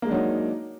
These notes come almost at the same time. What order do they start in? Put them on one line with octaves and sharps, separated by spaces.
A#3 G#3 D4 F#3 D#4